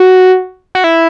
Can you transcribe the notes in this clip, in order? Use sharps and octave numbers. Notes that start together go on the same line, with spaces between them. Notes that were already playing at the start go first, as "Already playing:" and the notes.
Already playing: F#4
F#4
E4